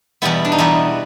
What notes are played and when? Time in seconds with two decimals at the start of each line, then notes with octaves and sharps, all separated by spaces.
0.22 E2 B2 G3 B3 E4
0.45 D4
0.52 D#4
0.58 E2 B2 G3 B3 E4